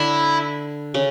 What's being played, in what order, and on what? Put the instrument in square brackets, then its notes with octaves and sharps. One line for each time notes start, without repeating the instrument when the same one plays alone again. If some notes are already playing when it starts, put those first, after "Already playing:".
Already playing: [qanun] D3 D4 [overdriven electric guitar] E4
[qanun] C#3 C#4